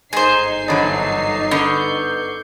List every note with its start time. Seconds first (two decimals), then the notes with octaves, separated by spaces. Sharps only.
0.13 G1 G#2 D#4 G#4 C5 C7
0.68 E2 D3 F#3 C#5 D#5 A5
1.51 D3 B3 C#6 G6